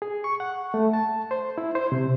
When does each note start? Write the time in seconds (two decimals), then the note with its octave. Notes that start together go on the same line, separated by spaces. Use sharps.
0.02 G#4
0.24 C#6
0.40 F#5
0.74 A3
0.93 A5
1.31 C5
1.58 E4
1.75 C5
1.92 C3